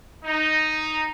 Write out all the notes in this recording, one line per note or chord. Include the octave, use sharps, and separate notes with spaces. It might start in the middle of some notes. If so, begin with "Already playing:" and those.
D#4